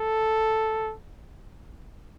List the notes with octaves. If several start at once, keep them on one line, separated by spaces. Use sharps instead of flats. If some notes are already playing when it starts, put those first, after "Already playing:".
Already playing: A4